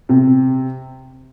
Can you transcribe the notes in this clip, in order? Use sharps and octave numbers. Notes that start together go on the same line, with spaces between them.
C3